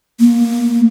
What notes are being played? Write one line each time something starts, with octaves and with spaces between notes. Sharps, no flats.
A#3